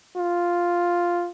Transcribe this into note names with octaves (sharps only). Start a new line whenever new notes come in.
F4